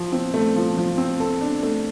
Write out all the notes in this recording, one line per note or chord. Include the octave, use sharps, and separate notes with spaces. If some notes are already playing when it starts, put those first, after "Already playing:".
Already playing: F3
C4
A3
F3
F3
C4
A4
D4
A3